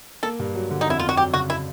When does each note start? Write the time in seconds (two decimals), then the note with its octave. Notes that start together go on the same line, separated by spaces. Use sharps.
0.23 A#3 A4
0.39 G2
0.55 F#3
0.71 D3
0.81 D#4
0.87 F2 E4
0.99 F2 F4
1.09 F#4
1.17 F#3 G4
1.34 C#3 F#4
1.50 E4